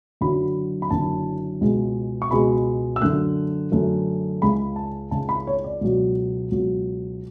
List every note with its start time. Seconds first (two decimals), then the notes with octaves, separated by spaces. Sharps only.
0.21 F#1 F#2 D3 F#3 B5
0.82 B5
0.90 F#1 F#2 D3 F#3 A5
1.61 C#2 B2 G#3
2.22 C#6
2.31 C#2 B2 G#3 B5
2.96 E6
3.01 F#2 D3 A3 F#6
3.72 F#2 D3 A3
4.42 C#2 C#3 G#3 B5
4.76 A5
5.11 C#2 C#3 G#3 A5
5.29 B5
5.47 C#5
5.64 D5
5.81 C#2 B2 F#3
6.51 C#2 B2 F#3